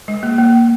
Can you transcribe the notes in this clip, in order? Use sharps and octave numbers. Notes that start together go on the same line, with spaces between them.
G#3
A#3
A#3